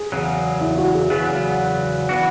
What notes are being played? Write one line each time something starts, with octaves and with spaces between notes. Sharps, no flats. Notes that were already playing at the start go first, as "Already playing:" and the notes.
Already playing: G#4
E2 C#3 F#3
E4
F#4
G#4
E2 C#3 F#3 B3 G#4
E3 B3 D4 F#4